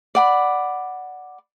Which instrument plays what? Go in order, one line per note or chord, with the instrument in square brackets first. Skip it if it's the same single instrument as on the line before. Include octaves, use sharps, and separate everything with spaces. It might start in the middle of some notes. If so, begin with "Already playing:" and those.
[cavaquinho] D5 F#5 B5